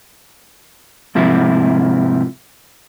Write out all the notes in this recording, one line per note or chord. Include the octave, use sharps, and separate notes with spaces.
G#2 C3 F3 E4